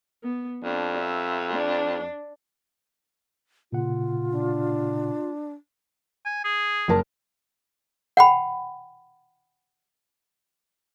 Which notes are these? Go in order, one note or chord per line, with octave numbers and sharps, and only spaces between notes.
B3
F2 D4
E5
D4
A#2 C#3 F4 F#5
D4
G#5
G#4
F#1 A#4 A5
F#5 G5 B5